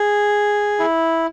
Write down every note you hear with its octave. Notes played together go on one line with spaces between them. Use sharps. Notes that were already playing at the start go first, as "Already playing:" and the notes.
Already playing: G#4
E4